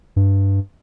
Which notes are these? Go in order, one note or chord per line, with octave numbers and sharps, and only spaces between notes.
G2